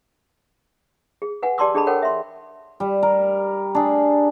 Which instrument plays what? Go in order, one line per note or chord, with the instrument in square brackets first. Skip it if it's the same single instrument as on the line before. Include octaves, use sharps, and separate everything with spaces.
[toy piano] G#4
B4 F#5 G#5
G4 D5 A5 C6 D6 E6
D4 G#4 A4 D#5 A5 B5
A4 A#4 C#5 F#5 G5
E5 C6
[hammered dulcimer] G3
A#4
D4 G#4